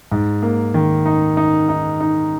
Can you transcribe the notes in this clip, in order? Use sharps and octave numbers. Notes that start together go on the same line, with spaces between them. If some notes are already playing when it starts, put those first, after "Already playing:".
G#2
A#3
D#3
D#4
D#4
D#4
D#4